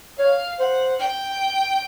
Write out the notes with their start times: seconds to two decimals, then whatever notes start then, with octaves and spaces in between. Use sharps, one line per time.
0.19 C#5 F5
0.59 C5 F#5
1.00 G5